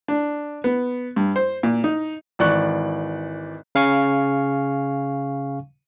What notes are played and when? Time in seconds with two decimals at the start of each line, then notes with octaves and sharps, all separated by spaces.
0.08 D4
0.64 B3
1.16 G2
1.36 C5
1.63 A#2
1.84 D#4
2.39 G#1 E3 D5 C#6 F#6
3.75 C#3 F5 G#5 C#6